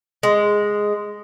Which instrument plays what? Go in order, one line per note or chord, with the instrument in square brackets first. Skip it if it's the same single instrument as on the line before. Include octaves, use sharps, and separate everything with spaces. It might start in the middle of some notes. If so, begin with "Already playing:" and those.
[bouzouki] G#3